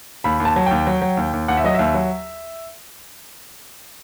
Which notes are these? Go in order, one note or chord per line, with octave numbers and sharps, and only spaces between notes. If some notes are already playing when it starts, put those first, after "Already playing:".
D#2 B5
D#2
A5
F#3
D#2 G5
F#3
F#3
D#2
D#2
D#2 F#5
E5
F#3 D#5
D#2 E5
F#3